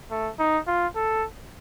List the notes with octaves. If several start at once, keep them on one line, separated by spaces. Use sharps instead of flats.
A3
D#4
F4
A4